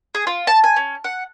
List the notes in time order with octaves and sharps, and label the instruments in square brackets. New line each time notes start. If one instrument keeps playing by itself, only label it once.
[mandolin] G#4
F4
A5
G#5
C#4
F#5